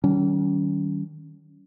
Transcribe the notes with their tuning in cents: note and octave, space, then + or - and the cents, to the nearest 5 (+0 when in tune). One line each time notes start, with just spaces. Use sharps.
D#3 +0 G3 -40 C#4 +25